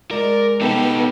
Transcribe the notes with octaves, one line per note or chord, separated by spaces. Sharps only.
G#3 A#4 D5
B3 D#4 G4 A4